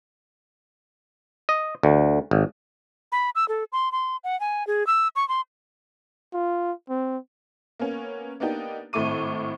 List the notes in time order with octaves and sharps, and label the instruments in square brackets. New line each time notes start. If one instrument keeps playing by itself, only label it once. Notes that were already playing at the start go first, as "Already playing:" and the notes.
[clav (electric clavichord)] D#5
D2
G#1
[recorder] B5
E6
A4
C6
C6
F#5
G#5
G#4
E6
C#6
C6
[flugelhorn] F4
C4
[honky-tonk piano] A#3 B3 C#4
A#3 B3 D4 D#4 G4
G#1 A2 A3 E4 D6 D#7